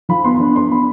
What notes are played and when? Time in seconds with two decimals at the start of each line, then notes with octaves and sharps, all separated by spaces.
0.09 F3 B5
0.24 B3 C6
0.35 C6
0.40 D4 B5
0.56 D4 C6
0.71 B3 B5